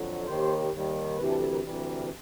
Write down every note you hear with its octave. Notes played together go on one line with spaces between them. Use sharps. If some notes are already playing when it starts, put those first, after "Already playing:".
Already playing: F2 D3 F#3
D#2 D#3 G3 C5
D#2 D#3 G3
D2 C3 E3 G3 B4
A4
A4
A#4
D2 C3 E3 G3